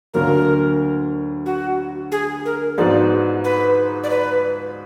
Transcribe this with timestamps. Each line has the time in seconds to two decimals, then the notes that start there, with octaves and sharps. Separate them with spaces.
0.14 D2 D3 F#3 A#3 A#4
1.46 F#4
2.12 G#4
2.45 A#4
2.78 G#2 F3 B3 D#4 F#4 D5
3.44 B4
4.03 D5
4.10 B4